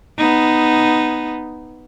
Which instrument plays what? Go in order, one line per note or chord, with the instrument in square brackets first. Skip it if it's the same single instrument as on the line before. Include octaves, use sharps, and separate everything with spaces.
[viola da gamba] B3 D#4